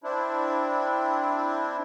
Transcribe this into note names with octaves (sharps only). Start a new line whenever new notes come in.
C4 D4 E4